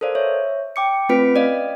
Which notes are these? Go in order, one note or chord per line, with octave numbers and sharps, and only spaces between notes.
A4 A#4 C5 D5 F5
C#5 E5
G5 D6 C#7
A3 C4 F4 B4 B6 D7
C#4 D5 D#5 F5